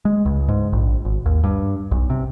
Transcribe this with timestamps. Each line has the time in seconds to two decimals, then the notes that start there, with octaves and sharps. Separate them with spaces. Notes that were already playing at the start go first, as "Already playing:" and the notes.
0.05 G#3
0.25 C#2
0.48 G#2
0.73 A#1
1.05 G#1
1.26 D#2
1.44 G2
1.91 B1
2.10 C3